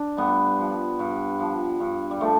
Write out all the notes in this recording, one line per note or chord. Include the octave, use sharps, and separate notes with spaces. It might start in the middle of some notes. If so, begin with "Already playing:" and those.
Already playing: D4
G2 G3 B3
F3
G2
F3
G2
G3
F3 A3